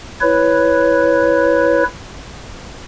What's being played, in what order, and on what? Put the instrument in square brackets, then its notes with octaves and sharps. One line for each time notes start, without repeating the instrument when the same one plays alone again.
[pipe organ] E4 B4 C#5